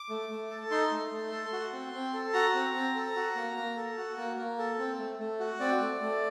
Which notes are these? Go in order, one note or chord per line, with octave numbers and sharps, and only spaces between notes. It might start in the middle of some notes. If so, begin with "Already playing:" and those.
Already playing: D6
A3
A3
A4
D#4 C6
A3
A3
A4
F#4
C4
C4
A4
F#4 A#5
C4
C4
A4
F#4
A#3
A#3
A4
F#4
A#3
A#3
A4
C4
A3
A3
F#4
C4 D5
A3
A3